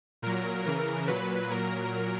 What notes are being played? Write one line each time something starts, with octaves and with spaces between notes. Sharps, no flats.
A#2 F#3 A#4
C#3 E3 A#4
A#2 F#3 B4
A#2 F#3 A#4